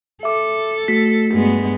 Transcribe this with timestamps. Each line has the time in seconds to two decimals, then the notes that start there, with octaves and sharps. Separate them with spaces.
0.23 A4 E5 D6
0.88 A3 F#4 B6
1.33 G2 G#3 B3